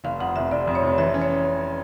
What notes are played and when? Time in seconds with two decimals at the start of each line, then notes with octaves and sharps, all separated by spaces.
0.04 F1 F5
0.20 F2 F#5
0.36 F1 E5
0.51 F1 D5
0.67 F2
0.75 C#5
0.83 F1
0.98 E3 E5
1.14 C#4
1.22 C#5